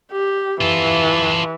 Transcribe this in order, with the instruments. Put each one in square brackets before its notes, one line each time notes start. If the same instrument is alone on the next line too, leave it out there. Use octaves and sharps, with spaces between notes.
[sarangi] G4
[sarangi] E3 [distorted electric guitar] F4 A4